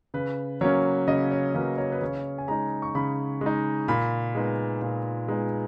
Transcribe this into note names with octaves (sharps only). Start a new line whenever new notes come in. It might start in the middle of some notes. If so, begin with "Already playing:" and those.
C#3 B4
F#3 A#3 C#4 C#5
C#3 D#5
C#5
F#3 A#3 C#4 B4
C#5
B4
C#3 C#5
G#5
G#3 D#4 A#5
C#6
C#3 B5
G#3 D#4
A#2 B5
G#3 B3 D#4
A#2
G#3 B3 D#4